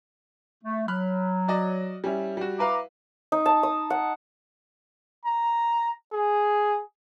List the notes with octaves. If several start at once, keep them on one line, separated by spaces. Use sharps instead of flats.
A3
F#3 B5 F6 F#6
F#4 D5 D#5
G3 C#4 E4
G3 F#4
E4 B4 F5 A#5 D6
D#4
A5
D#6
F#5
A#5
G#4